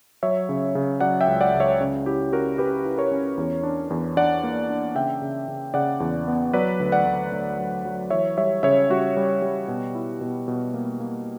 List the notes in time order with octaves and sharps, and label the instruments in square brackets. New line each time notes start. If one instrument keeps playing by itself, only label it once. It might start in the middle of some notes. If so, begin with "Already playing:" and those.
[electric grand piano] F#3 C#5 E5
C#3
C#3
F#3 D5 F#5
E5 G5
C#2
D5 F#5
C#2
C#5 E5
C#3
E4 G4
C#4 F#4 A#4
C#4 G4 B4
E4
A#4 C#5
C#4
E2
D4
E2
D4 D5 F#5
A#3
D4
C#3 E5 G5
C#3
C#3
C#3 D5 F#5
E2
B3
F#3 B4 D5
D2
D5 F#5
D2
D2
F#3
F#3
E3 C#5 E5
G3 C#5 E5
C#3 C#5 E5
G3 F#4
G3
G3
B2
E4
B2
B2
A#3
A#3